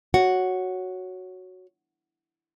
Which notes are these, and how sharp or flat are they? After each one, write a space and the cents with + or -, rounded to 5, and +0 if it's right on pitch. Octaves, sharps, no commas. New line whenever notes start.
F#4 +0 C#5 +0 F#5 +0